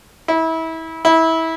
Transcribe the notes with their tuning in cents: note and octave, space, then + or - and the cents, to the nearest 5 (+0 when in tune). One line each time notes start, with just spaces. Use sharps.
E4 -30
E4 -25